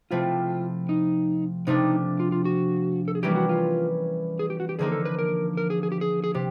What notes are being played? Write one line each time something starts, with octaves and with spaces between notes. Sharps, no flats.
C3 F3 A3 C4 E4 F4
D#4
C3 F3 A3 D4 D#4
F4
F4
F#4
A4
G#4
E3 G3 A#3 C#4 E4 G4
F#4
F4
G#4
G4
F#4
G4
D3 F3 A#3 D#4 G#4
A4
B4
A#4
A#4
G#4
G#4
G4
G#4
G#4
C3 G4